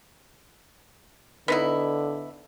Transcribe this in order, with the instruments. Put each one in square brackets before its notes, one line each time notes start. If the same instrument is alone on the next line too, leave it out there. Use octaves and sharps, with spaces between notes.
[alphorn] D3 [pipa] B3 D#4 E4